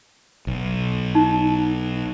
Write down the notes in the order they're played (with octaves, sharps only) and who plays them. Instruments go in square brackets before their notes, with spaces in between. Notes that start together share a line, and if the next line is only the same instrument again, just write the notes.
[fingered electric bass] B1
[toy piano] D#4